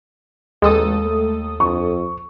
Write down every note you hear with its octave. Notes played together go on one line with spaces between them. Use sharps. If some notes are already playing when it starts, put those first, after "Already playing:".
A1 D#2 G#3 A4 D#6
A3
F2 C#6